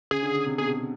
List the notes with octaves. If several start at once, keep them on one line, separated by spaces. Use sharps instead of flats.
C#3 G#4
D3
C#3
C3
B2 G#4